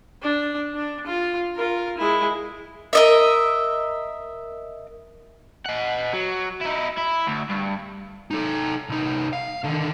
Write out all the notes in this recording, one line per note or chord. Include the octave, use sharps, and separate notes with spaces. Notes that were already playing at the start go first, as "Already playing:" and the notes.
D4
D4
F4
F4 A#4
G#3 E4
A#4 D#5 E5
D#5 F#5
F#3
D#4 E4
E4
D2
G2
D#4 A4
C2 D#4
F5
D3 D#3